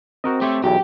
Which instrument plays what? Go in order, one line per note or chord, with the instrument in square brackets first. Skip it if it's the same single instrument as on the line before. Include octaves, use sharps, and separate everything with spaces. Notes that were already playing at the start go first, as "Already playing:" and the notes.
[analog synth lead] C4 [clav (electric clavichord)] F#4 A#4 D#5
[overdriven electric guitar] A3 [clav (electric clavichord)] G4 C5 C#5
[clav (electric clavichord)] B1 E2 [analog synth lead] F#3 [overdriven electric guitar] G4